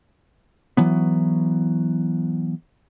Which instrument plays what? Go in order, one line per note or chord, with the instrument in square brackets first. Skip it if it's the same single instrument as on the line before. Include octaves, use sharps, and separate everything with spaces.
[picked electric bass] E3 F#3 B3